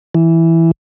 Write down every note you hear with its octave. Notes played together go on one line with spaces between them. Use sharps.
E3